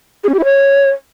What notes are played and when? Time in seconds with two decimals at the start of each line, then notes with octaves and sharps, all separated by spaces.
0.24 G#4
0.29 C#4
0.34 G4
0.39 E4
0.44 C#5